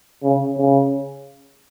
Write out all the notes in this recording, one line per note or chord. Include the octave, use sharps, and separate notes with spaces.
C#3
C#3